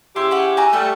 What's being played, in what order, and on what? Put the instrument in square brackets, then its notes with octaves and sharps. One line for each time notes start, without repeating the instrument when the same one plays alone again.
[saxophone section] C#3 E4 G4 [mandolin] C6
[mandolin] C#4 F#5
F#4 G#5 A#5
[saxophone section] G3 A3 [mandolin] G4 A4 C#6